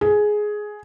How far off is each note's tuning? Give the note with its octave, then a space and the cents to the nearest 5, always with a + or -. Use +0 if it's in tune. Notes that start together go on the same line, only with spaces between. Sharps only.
G#4 +10